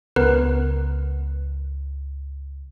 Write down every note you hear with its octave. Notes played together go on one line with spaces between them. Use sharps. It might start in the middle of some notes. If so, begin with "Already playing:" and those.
C#2 B3 A#4 B4